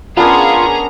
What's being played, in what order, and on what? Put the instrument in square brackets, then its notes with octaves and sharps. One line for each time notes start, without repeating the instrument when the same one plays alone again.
[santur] B3 D4 A#4 [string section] C#4 G#4 [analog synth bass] F4 [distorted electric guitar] A#5